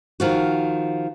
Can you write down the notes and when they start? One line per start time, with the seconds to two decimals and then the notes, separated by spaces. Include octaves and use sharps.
0.20 D#3 F3 F#4